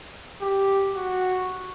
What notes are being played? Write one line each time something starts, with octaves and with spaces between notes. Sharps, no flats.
G4
F#4